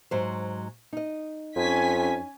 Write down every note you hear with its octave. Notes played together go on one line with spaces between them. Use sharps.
G#2 F#3 C5
D#4 D#5
F2 C#4 G#5 B6